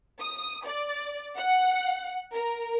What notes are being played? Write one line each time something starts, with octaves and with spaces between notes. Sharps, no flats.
D#6
D5
F#5
A#4